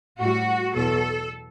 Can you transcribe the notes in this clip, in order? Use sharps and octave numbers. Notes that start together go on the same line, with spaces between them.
A2 G3 F#4
E2 B2 F#3 A4